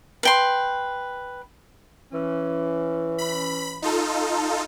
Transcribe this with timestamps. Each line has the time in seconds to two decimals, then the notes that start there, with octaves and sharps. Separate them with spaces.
0.23 B4 G5 C6
2.12 E3 C#4
3.18 B5
3.82 D#4 F4 A4